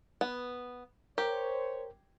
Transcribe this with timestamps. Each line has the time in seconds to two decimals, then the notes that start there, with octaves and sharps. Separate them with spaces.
0.21 B3
1.18 G4 A#4 C5 C#5